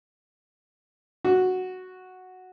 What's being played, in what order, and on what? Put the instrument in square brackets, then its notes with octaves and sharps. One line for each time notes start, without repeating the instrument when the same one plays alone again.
[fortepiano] F#4